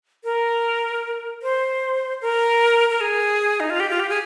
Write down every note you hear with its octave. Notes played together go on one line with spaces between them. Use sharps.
A#4
C5
A#4
A#4
G#4
D#4
F4
G4
F4
G4
G#4